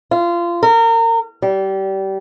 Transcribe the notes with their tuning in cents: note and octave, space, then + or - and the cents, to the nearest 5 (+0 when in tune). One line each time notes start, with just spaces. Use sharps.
F4 -20
A#4 -30
G3 -25